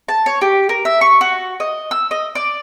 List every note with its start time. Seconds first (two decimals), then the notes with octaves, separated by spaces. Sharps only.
0.09 A5
0.26 C#5
0.41 G4
0.69 A#4
0.85 E5
1.01 C#6
1.21 F#4
1.60 D#5
1.91 E6
2.11 D#5
2.35 D5